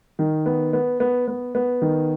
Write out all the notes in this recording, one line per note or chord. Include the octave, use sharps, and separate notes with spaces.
D#3
B3
B3
B3
B3
B3
D#3